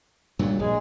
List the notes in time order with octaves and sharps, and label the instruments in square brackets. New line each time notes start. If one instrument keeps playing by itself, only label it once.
[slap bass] G2 A#2 F#3
[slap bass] A#1 [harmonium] G#3 G#4